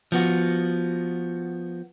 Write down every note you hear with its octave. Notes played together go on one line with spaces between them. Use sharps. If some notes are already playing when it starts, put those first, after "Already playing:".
F3 B3 F#4